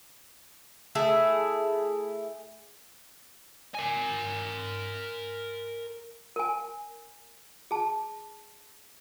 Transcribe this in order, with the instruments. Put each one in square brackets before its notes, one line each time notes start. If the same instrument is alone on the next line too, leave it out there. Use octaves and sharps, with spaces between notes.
[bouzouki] A3 E4 G#4
[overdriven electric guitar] A#4 G#5
[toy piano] A#4 G#5
G#4 A5